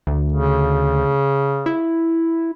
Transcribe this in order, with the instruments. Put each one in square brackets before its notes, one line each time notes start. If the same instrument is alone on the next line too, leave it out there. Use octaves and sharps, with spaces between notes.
[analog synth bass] D2
[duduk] C#3
[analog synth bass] E4